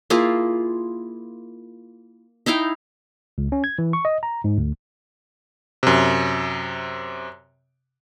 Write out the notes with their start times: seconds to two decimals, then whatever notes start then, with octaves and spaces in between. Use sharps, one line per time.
0.10 A#3 E4 F4 G#4
2.46 D#4 E4 F5 G5
3.38 C#2
3.52 C#4
3.64 G#6
3.79 E3
3.93 C#6
4.05 D#5
4.23 A#5
4.44 G#2
4.58 D2
5.83 F#2 C3